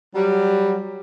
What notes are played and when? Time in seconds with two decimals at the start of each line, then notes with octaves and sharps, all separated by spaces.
0.15 F#3 G3